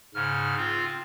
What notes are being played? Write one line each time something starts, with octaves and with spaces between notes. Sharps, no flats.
G#2 C#3 F6
C4 F4